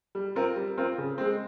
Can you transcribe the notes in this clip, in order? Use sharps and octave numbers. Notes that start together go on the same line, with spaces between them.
G3
C4 F4 A#4
G3
C4 F4 A#4
C#3
G#3 C4